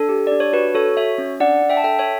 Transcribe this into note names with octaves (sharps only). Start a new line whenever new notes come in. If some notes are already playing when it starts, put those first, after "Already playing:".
Already playing: D4 A4
G4
D4 D5
C#5
F#4 B4
F#4 A4 C#5
F#4 C#5 E5
C#4
D4 D5 F#5
D4
E5 G5
A5
A4 E5 G5
C#5 E5